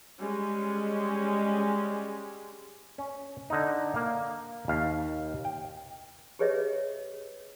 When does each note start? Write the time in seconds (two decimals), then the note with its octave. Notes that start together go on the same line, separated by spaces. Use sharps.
0.20 G3 G#3 C#4
2.98 C#4
3.50 D3 D#4
3.94 A#3 F5
4.68 D#2 F5
5.45 G5
6.39 G4 G#4 B4 C#5 D#5 E5